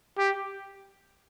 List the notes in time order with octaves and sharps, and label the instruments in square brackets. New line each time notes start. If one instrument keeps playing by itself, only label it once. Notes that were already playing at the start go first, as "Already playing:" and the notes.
[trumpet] G4